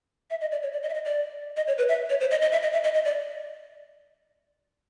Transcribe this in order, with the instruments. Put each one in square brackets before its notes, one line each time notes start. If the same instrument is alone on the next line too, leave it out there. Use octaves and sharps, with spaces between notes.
[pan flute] E5
D#5
D5
C#5
D5
D#5
E5
D#5
D5
D#5
C#5
B4
E5
C#5
C5
D#5
D#5
E5
D#5
E5
D#5
D#5
D5